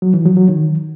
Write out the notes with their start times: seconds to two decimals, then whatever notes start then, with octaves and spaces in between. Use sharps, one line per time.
0.02 F#3
0.14 E3
0.25 F#3
0.37 F#3
0.49 D#3